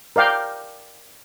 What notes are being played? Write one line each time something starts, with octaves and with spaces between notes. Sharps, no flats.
A#4 D5 F5 G5